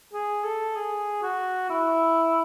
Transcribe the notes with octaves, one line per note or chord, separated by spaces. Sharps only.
G#4
A4
G#4
F#4
E4